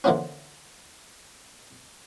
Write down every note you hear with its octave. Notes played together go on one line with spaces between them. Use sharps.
D3 E3 F3 A#3 B3 C#4